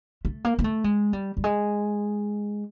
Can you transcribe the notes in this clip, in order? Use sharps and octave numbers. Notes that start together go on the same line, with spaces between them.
A3
A#3
A#3
A3
G#3
G3
G3
G#3